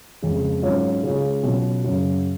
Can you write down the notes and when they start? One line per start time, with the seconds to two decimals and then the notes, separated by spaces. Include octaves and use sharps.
0.22 F2 C#3 G#3
0.62 G#2 F#3 C#4 F4
1.03 C#3 G#3 C#4 F4
1.43 B2 F#3 C#4 F4
1.84 F#2 C#3 F#3 C#4